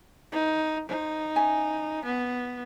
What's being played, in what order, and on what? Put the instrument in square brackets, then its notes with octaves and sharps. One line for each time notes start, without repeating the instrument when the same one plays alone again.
[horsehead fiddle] D#4 [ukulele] B4
[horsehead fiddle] D#4 [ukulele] C5
[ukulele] C#4 E5 G#5
[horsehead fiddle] B3